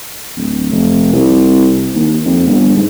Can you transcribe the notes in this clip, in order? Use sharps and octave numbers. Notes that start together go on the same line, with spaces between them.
D1
F1
C2
D#2
F2
G1
G#2